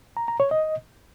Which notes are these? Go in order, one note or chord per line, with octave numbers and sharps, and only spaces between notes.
A#5
A#5
C#5
D#5